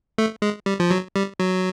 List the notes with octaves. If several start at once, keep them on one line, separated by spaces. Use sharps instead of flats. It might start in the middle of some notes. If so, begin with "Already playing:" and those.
A3
G#3
G3
F3
F#3
G3
F#3